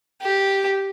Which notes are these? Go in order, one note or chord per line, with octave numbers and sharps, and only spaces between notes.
G4